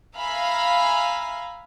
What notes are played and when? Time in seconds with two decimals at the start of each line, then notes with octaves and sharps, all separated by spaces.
0.17 E5 F5 G#5 A#5 B5